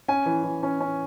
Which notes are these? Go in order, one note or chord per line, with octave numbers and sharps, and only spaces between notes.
C#4 G#5
E3
E3
C#4
C#4